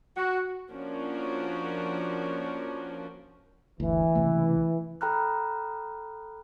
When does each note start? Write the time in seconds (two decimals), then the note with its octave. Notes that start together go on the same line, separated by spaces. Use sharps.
0.16 F#4
0.71 F3 A#3 C#4 D4 F#4 A#4
3.80 G1 D2 E3
4.15 C#2 C3 A3
5.01 A4 G5 A#5 B5 F6 F#6